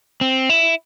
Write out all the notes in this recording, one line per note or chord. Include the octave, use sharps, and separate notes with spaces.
C4
E4